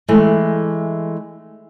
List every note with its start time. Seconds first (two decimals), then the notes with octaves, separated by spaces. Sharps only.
0.08 E3 G#3 A3